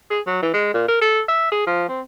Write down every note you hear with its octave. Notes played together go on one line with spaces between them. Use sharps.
G#4
F#3
E3
G#3
A#2
A#4
A4
E5
G#4
F3
C4